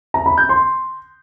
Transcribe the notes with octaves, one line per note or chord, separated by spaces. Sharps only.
A#5
B5
G6
C6